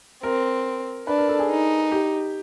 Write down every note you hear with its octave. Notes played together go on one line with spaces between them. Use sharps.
C4 A#4
D4 B4
A#4
A4
G#4
D#4
G4